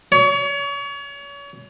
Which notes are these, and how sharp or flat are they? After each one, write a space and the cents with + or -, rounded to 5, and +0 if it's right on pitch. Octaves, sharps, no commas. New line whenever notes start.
C#5 +35